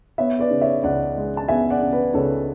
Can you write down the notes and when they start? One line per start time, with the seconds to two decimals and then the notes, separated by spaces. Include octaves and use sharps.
0.18 B3 C#5 E5
0.39 B4 D5
0.51 C#3
0.61 C#5 E5
0.83 C#2 D5 F#5
1.17 G#3
1.37 A5
1.48 B3 E5 G#5
1.70 D5 F#5
1.82 C#3
1.93 B4
2.14 C#2 A4 C#5